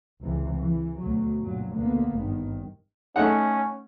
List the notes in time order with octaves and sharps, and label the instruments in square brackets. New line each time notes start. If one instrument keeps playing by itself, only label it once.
[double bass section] C#2 C3 E3
E3
D2 B2 F#3
G2 A#2 F#3
D2 D3 A#3 B3
G#1 G2 D#3
[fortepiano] A3 D#4 F#5 [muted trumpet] C#4